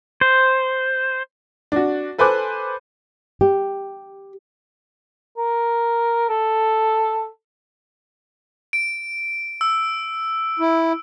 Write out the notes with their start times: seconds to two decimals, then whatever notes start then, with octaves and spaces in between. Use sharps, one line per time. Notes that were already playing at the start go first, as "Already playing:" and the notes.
0.21 C5
1.72 D4 F#4
2.18 A4 B4 C5 G#5 D6 F#6
3.41 G4
5.37 A#4
6.29 A4
8.73 D7
9.61 E6
10.59 E4